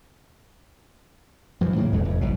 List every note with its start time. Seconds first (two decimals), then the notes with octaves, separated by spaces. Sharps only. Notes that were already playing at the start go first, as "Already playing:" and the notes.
1.61 F#2 E3 F3
1.76 A2 C#3 F3 A#3
1.93 D#1 E2 G#3 A3
2.05 F1 F2
2.21 F#1 B2